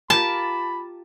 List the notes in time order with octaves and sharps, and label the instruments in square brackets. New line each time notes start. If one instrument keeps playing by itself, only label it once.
[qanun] F4 G4 A#4 [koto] A5 [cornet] B5